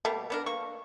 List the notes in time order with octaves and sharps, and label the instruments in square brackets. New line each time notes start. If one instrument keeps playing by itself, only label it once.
[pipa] B2 G3 A#3 [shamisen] A3
[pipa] B3 D4 A#4
A#3 C#6